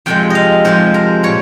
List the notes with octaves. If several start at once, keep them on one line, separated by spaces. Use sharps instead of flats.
F2 C3 F3 G#3 G5
D#5 F5
F2 C3 F3 G#3 C5
A#4
A#2 G3 C#5